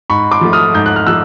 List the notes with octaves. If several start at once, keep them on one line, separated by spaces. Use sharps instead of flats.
G#2 B5 C#6
C6 D6
F3 A3
D#6 F6
G#2 G6
F#6
F6
F3 A3 E6 F#6